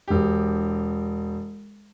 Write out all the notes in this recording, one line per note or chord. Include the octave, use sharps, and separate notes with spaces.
E1 G4